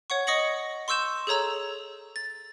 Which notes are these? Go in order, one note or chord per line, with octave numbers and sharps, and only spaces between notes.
C#5 F#5 C#6
D#5 C#6 D#6 A#6 C#7 F#7
C6 C#6 E6 G6 E7
G#4 A4 C#5 A#5 E6
A6